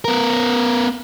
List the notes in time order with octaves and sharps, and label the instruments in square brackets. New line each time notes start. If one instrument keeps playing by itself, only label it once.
[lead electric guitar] B3 A#4